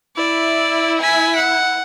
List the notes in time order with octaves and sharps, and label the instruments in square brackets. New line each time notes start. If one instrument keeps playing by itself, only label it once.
[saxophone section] E4 [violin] D5
[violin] G#5 B6
F#5